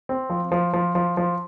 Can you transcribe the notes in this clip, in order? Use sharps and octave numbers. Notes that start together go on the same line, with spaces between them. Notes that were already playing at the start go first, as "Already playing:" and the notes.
C4
F3
F3
F3
F3
F3